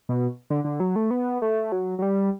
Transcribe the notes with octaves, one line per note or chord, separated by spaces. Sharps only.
B2
D3
D3
F#3
A3
B3
A3
F#3
F#3
G3